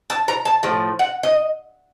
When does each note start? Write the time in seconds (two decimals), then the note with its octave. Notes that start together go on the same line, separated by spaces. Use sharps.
0.10 A5
0.28 A#5
0.45 A5
0.63 A2 F3
0.99 F#5
1.23 D#5